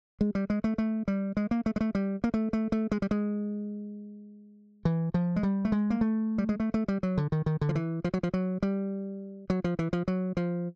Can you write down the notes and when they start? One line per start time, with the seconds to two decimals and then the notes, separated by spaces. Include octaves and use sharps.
0.21 G#3
0.35 G3
0.50 G#3
0.64 A3
0.78 A3
1.08 G3
1.37 G#3
1.51 A#3
1.66 A3
1.76 G#3
1.81 A3
1.95 G3
2.24 A#3
2.34 A3
2.53 A3
2.72 A3
2.92 G#3
3.02 G3
3.11 G#3
4.85 E3
5.14 F3
5.36 G#3
5.43 G3
5.65 A3
5.72 G#3
5.90 A#3
6.01 A3
6.38 G3
6.49 G#3
6.60 A3
6.74 A3
6.88 G3
7.03 F#3
7.18 D3
7.32 D#3
7.46 D#3
7.61 D3
7.69 F3
7.75 E3
8.04 F3
8.14 F#3
8.23 F3
8.34 F#3
8.63 G3
9.50 F#3
9.64 F3
9.79 E3
9.93 F3
10.08 F#3
10.37 F3